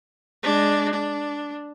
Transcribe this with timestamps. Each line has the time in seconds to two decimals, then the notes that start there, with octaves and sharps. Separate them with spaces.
0.43 G#3 D4
0.93 D4